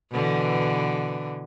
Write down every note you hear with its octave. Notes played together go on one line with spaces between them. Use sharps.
B2 D3 E3